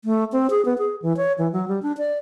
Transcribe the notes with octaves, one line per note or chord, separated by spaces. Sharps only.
A3
C4
G#4
B3
G#4
E3
C#5
E3
F#3
G3
D4
D5